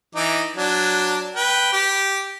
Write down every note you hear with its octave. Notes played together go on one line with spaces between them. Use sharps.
E3 D#4 D6
F#3 D4
B4 G5
G4